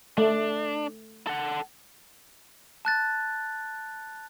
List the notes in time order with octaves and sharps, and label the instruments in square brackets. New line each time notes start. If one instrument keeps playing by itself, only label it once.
[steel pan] A3 [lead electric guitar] D4
[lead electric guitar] A4 F#5
[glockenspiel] A5 F#6 A6